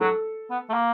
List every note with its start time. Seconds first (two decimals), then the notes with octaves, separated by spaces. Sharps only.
0.01 F#3 A4
0.50 B3
0.69 A3
0.74 A#3